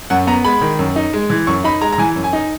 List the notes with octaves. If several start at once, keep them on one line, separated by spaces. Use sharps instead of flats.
F#2 F#5
B3 A#5
G#3 B5
D#3
F#2
D#4
G#3
E3
F#2 C#6
D#4 B5
G#3 A#5
A#5
E3 G#5
F#2
G#5
D#4